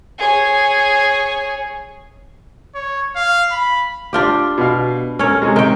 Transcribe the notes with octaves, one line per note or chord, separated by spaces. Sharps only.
G#4 C#5
C#5
F5
B5
D4 F4 G4
B2 F5
C#4 A4 A#4 C#5
C3 G#3
D#3 G5